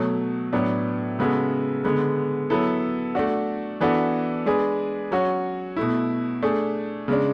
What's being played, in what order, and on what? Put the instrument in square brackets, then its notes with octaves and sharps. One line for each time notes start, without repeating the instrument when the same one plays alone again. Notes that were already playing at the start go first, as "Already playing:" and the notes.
Already playing: [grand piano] B2 F#3 A3
A2 F#3 B3 D4
C#3 G#3 B3 F#4 A4
D3 G#3 B3
F#3 B3 E4 A4
A3 D4 F#4
E3 B3 D4 F#4 A4
G#3 D4 G#4 B4
F#3 C#4 F#4 C#5
B2 A3 E4
A3 D4 G#4
C#3 G#3 D4